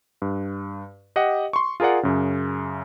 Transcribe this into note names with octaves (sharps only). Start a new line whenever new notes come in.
G2
G4 D#5 F#5
C6 C#6
F4 G#4 A#4 D5 F#5
F#2 C#3